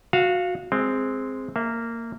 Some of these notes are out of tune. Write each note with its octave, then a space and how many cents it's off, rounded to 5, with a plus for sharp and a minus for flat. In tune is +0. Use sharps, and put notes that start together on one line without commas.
F#4 -20 F5 -5
G#3 +0 C4 +0
A#3 -15 E5 +0